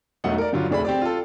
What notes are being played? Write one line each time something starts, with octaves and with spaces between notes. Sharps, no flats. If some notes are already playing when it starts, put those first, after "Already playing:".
E1 B1 A3 D#4 F#5
A#4 D5
G2 D3 F#3 F4
F1 D2 D4 G#4 B5
C4 G4 D5
F4 A4